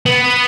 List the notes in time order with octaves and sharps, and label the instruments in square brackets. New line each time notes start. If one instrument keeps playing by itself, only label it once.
[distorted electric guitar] B3